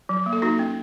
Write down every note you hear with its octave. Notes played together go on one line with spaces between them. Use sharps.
F#3
A#3
A4
A#3 D#4 F#4
C#4